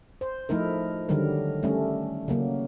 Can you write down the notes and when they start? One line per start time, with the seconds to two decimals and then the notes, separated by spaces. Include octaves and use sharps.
0.21 C5
0.49 F3 A3 D#4 E4 A#4
1.09 D3 D#3 F#3 G3 A#4
1.63 G3 A3 C#4
2.28 C#3 F#3 A#3